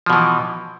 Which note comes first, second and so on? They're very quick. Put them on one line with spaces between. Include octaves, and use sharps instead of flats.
F3 B2 E3